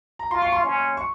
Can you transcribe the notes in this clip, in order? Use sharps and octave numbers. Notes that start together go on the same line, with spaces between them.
A#5
F4 C6
C#6
C6
C#4
C#6